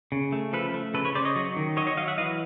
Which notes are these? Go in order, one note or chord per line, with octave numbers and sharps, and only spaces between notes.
C#3
A3
F3 A4 B4
A3
C#3 A4 B4
B4 C#5
C#3 C5 D5
C#5 D#5
F#3
D#3
F#3 C#5 D#5
C#5 D#5
F#3 D#5 F5
E5 F#5
E3 D#5 F5